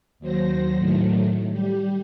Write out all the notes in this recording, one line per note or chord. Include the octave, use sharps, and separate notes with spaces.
D#2 F#3 C5 A#6
A2 D#3 F#3 A3
G3 G4